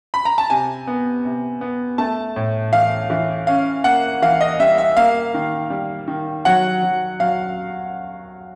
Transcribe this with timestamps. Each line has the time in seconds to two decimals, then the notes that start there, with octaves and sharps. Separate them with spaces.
0.14 B5
0.25 A#5
0.38 A5
0.50 C3 G#5
0.87 B3
1.25 C3
1.61 B3
1.98 A3 A5
2.36 A2
2.73 E3 F5
3.10 E3
3.47 C#4 F5
3.84 A#3 F#5
4.22 E3 F5
4.41 D#5
4.60 G3 E5
4.78 E5
4.97 A#3 F5
5.34 D#3
5.70 G3
6.07 D#3
6.45 F#3 F#5
6.83 F#3
7.20 F#3 F5